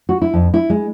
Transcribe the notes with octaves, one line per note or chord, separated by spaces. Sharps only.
F#4
E4
F2
E4
G#3